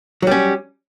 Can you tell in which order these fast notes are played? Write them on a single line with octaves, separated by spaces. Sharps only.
F#3 G3 C#4